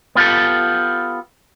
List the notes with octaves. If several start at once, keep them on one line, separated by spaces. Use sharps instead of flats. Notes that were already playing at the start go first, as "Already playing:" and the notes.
B3 F4 G4 A4